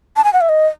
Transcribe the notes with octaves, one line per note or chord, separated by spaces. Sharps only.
A5
G#5
F#5
E5
D#5